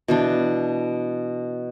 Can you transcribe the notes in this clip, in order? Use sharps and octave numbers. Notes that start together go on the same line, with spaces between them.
B2 E3 D4